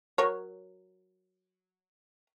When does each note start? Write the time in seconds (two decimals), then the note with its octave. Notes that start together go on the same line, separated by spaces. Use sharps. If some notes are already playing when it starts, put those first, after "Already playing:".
0.18 F#3 A#4 C#5